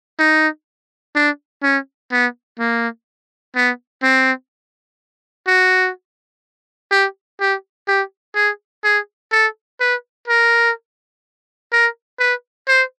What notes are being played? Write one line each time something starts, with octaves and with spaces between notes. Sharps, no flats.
D#4
D4
C#4
B3
A#3
B3
C4
F#4
G4
G4
G4
G#4
G#4
A4
B4
A#4
A#4
B4
C5